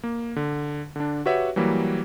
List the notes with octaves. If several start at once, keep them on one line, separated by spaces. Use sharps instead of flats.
A#3
D3
D3 D4
F#4 G4 B4 C#5 E5 F#5
E3 F#3 G3 A#3